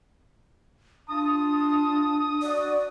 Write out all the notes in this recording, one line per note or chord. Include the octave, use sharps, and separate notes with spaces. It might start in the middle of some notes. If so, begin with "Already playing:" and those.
D4 F4 A5 D#6
F#4 D5